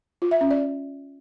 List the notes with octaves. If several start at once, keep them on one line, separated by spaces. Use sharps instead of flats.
F4
E5
C#4
D5